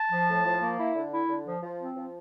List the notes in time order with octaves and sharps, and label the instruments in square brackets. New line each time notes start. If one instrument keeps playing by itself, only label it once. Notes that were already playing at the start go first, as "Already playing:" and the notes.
Already playing: [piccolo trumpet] A5
[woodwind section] F3
A2
F3
A#3
E4
D3
E4
D3
F3
F3
C4
F3